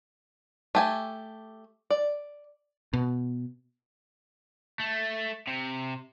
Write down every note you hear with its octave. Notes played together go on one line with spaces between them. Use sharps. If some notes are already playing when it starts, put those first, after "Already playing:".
A3 G4 G#5
D5
B2
A3
C3